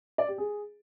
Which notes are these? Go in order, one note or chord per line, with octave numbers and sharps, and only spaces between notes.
D5
G4
G#4